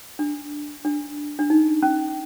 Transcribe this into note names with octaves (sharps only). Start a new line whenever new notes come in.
D4
D4
D4
D#4
C#4